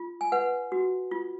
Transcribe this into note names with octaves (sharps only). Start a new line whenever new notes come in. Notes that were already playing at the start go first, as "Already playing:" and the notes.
Already playing: F4
G#5
B4 F#5
F#4
F4